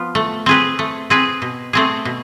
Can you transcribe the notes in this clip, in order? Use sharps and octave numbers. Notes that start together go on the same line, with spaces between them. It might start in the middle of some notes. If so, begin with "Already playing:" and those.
Already playing: F3 B3 F4
A3
C4 G#4 B4
A3
C4 G#4 B4
B2
A3 C4 G#4
B2